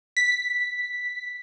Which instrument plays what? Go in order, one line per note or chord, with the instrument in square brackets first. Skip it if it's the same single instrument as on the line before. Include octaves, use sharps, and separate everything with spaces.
[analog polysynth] B6